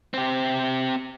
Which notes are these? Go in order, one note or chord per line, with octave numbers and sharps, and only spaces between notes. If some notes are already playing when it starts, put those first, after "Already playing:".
C4 G4